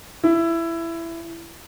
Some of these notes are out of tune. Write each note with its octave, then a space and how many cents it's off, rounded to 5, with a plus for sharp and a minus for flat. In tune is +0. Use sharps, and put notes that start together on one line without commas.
E4 +15